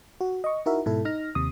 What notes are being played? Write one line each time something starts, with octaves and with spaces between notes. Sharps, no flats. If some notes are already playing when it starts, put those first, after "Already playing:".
F#4
D#5 C#6
D#4 E4 F#4 A#4 E5
G#2 B2 E4 A4
D#4 F6 A#6
D#2 C3 D#6